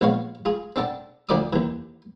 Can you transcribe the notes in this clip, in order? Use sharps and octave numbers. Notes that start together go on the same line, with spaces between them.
A#1 G#3 B3 C#5 F5
F4 G#4
C4 D4 A4 F#5 A5
D2 F3 A3 D5 D6 D#6
D#2 E3